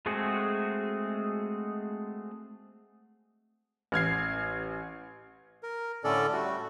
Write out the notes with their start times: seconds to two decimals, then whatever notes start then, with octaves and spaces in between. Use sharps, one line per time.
0.06 G#3 A3 C4 F#4 G#4
3.92 A1 F6 G#6 C7
5.63 A#4
6.04 A2 D3 C#4 A4 D5
6.33 G3 A3 F#4